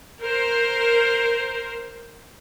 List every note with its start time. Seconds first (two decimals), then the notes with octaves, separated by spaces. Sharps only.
0.21 A#4 C5